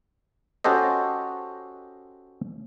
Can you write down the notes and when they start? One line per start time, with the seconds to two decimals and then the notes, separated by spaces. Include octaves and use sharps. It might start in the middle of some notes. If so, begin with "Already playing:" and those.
0.64 C#4 F#4 G4 A4 C5 D#5